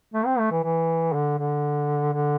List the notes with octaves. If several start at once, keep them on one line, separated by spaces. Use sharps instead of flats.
A3
C4
A3
E3
E3
D3
D3
D3